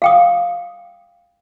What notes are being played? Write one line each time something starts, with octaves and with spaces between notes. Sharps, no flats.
F5 G5 D#6